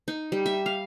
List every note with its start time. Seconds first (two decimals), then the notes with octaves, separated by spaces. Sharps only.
0.08 D#4
0.32 G3
0.46 E5
0.66 F5